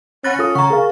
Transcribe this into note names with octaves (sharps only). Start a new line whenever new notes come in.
C#4 F#5 B5 F#6 A6 A#6
F4 A4 D#6
C#3 F#5 A#5 C#6
G#4 A#4 F5